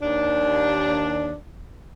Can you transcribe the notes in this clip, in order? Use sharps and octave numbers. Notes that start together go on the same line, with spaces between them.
D#2 D4